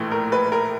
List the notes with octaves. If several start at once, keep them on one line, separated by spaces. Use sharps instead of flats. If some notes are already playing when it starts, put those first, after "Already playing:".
Already playing: A#1 A2 E3 A3
A#4
B4
A#4